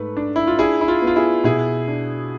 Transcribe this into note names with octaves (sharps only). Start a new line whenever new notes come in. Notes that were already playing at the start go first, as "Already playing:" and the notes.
Already playing: G#2 A3 B4
D4
E4
F4
D4 E4 G#4
E4
F4
B3
F4
E4 G#4
B2 E4 G#4
D4